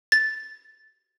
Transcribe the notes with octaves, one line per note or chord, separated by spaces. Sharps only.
A6